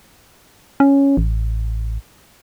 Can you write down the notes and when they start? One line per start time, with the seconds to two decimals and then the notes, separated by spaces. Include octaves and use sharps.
0.80 C#4
1.17 A1